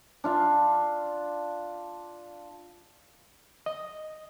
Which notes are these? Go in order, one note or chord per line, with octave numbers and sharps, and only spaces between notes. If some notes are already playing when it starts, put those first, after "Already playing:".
D4 F4 F5
D#5